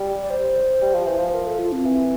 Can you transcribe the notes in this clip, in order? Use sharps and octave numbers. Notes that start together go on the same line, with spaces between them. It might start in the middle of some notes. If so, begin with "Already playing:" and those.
Already playing: G3
D5
C5
G3
F3
E3
F3
C5
A#4
A4
F4
C4
E3